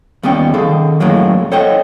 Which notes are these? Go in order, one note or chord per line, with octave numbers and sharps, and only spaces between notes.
D#2 G3 B3 C#4 G5
D#3 G#4 A4
F#2 A2 F#3 G#3 A#3
A4 C5 C#5 D#5 F#5 G5